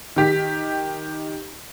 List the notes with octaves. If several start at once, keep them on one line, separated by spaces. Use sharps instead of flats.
D#3 G4 B6